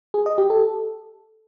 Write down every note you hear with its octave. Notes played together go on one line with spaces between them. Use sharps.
G#4
D#5
G4
A4